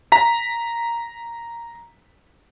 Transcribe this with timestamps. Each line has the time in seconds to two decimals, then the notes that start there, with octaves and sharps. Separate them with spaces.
0.12 A#5 B6